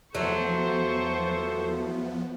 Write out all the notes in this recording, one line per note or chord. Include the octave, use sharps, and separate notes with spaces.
E2 F3 F#3 A3 B3 A4 C5 C#6